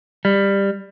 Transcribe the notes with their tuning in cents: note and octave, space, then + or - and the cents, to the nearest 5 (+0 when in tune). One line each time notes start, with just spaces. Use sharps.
G3 +15